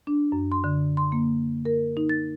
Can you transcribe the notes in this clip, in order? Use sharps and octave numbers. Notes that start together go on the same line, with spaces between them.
D4
F#2
C6
D3
C6
A#3
A#4
D#4
A6